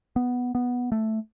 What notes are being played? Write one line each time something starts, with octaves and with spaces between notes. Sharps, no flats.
B3
B3
A3